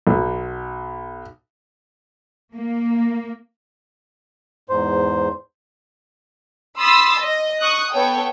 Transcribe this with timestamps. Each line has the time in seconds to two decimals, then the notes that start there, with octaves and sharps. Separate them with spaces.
0.07 B1
2.55 A#3
4.70 E2 G#2 C5
6.79 B5 C6 D#6 E6 A6 B6
7.18 D#5
7.60 C#6 D#6 F#6
7.92 B3 A4 C#5 G5